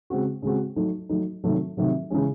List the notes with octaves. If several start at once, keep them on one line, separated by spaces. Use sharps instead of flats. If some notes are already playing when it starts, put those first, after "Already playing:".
C#3 G#3 C4 F#4
C#3 G#3 C4 F#4
F#3 A3 D#4
F#3 A3 D#4
C3 D#3 F#3 A3
C3 D#3 F#3 A3
C#3 E3 G#3 C#4